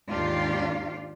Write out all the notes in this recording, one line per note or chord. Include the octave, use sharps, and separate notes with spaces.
D#2 G#2 D4 F4 G4 F5